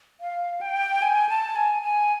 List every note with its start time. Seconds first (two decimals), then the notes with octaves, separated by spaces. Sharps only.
0.21 F5
0.61 G5
1.02 G#5
1.29 A5
1.56 G#5
1.82 G#5